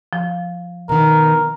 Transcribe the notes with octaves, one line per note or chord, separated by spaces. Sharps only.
F3
B2 D#3 A#4